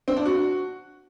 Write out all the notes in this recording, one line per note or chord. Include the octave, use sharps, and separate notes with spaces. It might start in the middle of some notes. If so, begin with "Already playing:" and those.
C4
D4
F#4